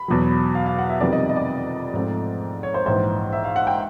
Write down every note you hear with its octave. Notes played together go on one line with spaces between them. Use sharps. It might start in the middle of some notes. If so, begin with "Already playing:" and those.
Already playing: B5
E2 B2 F#3
F5
F5
F#5
E5
F2 C3 D#3 G3 B3 D5
D#5
D#5
D5
G#2 F3 A3 C4
C#5
C5
A#1 G#2 E3 C5
E5
F5
F#5
G5